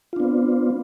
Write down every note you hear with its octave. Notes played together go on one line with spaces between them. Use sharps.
B3 C4 D4 F4